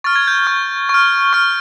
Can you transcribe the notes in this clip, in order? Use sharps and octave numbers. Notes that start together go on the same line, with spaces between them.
C#6 F6 A6
G#6
G6
G#6
C#6 F6
C#6 F6
C#6 F6